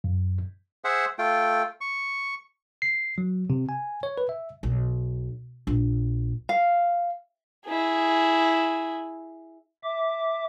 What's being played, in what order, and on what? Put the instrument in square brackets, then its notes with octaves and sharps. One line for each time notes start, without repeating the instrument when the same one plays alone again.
[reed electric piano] F#2
[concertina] G#4 C5 E5 F#5
A3 F4 G5
C#6
[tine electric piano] C7
F#3
C3
G#5
C#5
B4
E5
[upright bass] B1
A#1
[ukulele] F5
[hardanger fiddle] E4 G#4
[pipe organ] E5 D6